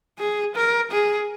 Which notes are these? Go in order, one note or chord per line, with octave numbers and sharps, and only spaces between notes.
G#4
A#4
G#4